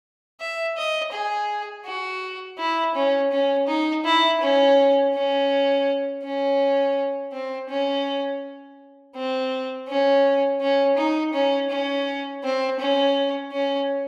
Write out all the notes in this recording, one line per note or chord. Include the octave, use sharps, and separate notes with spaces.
E5
D#5
G#4
F#4
E4
C#4
C#4
D#4
E4
C#4
C#4
C#4
C4
C#4
C4
C#4
C#4
D#4
C#4
C#4
C4
C#4
C#4